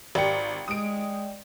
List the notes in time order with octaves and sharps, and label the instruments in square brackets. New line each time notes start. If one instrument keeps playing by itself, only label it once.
[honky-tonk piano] G#1 G4 C#7 [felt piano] D5 G5
[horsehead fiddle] G#3 [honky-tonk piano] D#6 D7